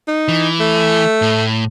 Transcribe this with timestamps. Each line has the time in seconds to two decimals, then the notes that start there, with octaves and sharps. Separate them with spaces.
0.08 D#4
0.28 E3
0.60 A3
1.22 A2